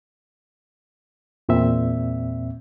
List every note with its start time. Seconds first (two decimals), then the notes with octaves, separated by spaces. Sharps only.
1.49 E2 A#2 C4 E5